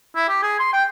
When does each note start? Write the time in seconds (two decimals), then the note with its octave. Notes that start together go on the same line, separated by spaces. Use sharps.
0.16 E4
0.29 G4
0.43 G#4
0.59 C6
0.73 G5